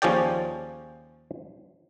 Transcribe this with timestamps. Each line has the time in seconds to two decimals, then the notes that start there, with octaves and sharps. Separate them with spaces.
0.02 D#2 F3 C#4 G#4 D5 G5